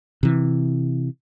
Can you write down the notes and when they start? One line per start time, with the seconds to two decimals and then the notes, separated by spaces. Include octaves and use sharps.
0.23 C3 E3